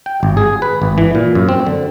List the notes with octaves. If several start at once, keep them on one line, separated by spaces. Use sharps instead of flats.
G5
G#1
G#4
B4
G#1
E3
A#2
F#2
C4
D3